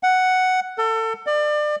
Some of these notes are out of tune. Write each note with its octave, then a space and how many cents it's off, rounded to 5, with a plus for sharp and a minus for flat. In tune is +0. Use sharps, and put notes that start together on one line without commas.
F#5 +5
A4 +30
D5 +30